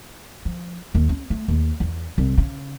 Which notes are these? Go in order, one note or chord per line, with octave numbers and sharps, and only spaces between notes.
F3
D#2
C#4
A3
D#2
E2
C2
C#3